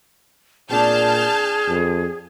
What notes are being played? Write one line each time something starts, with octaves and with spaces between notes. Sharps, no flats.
A#2 C4 D4 G#4 A5 F6 G6
F2